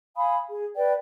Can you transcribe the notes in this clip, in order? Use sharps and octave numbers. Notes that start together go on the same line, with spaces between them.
F5 G#5 B5 D#6
G#4
B4 D5 G5